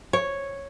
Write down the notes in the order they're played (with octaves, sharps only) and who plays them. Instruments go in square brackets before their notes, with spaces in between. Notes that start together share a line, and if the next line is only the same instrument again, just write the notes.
[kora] C#5